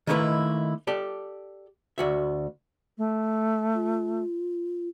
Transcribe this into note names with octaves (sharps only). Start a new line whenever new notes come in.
D#3 A3 A#3 D#4 E4 B4
G4 A4 D5
D2 F#4 E5
A3
F4